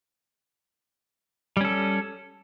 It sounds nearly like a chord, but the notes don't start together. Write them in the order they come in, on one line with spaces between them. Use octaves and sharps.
G3 C#4 A4